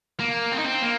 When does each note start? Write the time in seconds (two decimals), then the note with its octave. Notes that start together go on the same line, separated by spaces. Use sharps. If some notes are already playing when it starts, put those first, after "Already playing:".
0.19 A#3
0.52 C4
0.58 D#4
0.66 C4
0.82 A#3